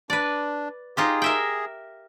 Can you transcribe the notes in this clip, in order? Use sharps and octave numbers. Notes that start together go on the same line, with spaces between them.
D4 B4 D5
D#4 F4 G4 G#4
A#4 E5 G5